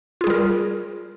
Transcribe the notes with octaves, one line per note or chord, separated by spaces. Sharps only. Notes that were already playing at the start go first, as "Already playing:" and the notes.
G3 F4 G#4 A#4